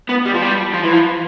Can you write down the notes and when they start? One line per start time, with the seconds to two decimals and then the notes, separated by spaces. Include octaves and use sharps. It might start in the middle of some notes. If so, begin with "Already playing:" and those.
0.09 B3
0.26 G3
0.35 F3
0.42 G3
0.74 F3
0.84 E3
0.93 F3